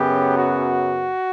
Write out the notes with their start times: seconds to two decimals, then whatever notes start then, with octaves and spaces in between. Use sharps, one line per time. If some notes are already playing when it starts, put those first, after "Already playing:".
Already playing: F#2 C#3 F#3 B3 G4
0.33 F#4